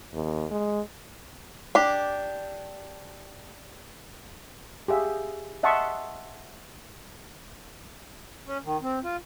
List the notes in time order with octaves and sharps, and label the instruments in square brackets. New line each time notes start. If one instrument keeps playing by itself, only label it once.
[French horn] D#2
G#3
[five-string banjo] D4 G4
[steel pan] G4 G#4 E5 F5
D#5 E5 F#5 A5 C6 C#6
[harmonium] C#4
D#3
C4
F4